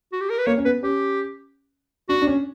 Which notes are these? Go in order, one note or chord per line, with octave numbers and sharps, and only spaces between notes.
F#4
G4
A#4
B4
A#3 C#5
C#4
B3 B4
C#4 G4
D4 F#4
D4
C#4